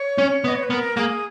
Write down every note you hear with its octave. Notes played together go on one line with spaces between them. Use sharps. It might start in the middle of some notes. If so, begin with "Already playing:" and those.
Already playing: C#5
C#4
B3
D#5
C#5
B4
B3 A#4
A#3 G#4